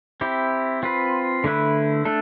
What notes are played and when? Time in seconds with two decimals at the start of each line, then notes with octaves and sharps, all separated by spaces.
0.21 C4 E4 G4
0.83 C4 F4 B4
1.44 D3 A3 E4 B4
2.05 A3 D4 A4